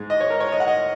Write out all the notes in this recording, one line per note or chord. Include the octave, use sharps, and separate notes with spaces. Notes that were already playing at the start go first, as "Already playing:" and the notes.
Already playing: G#2 G#3
D#5
C#5
A#4
C#5
D#5
F#5
D#5